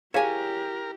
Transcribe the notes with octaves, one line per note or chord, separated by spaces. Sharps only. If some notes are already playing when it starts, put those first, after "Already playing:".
E4 G4 G#4 A#4 C#5 F5 G#5 E7